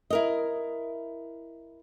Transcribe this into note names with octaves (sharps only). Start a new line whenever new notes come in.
E4 A#4 D#5